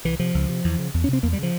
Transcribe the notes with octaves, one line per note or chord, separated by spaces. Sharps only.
C2 E3
C3 F3
C#2
C3
E2
C#3
E2
C#4
C3 C4
E2 A#3
G3
C#3 F3